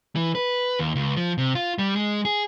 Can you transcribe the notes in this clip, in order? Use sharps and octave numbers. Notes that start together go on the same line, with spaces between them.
E3
B4
D#2
C#2
F3
C3
F4
G3
G#3
G#4